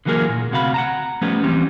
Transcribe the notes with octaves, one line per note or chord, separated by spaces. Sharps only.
D3 E3 F#3 A#3 G#4 A#4
A#2
D2 C3 F#4 F5 B5
F#5 A5 A#5
F3 G3 A3 B3 C#4
E3 G3 C4 C#4